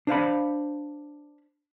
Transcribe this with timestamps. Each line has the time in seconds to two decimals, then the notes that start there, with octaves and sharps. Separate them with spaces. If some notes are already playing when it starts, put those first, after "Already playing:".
0.07 D4 C5 F5 B5